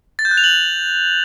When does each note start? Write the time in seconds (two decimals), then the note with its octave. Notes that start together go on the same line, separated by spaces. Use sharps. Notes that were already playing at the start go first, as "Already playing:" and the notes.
0.19 A6
0.25 G6
0.31 F#6
0.37 F7
0.44 F#7